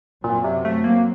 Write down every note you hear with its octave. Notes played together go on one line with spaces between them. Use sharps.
F#2 A#2 F#3 C4
C3
A3
A#3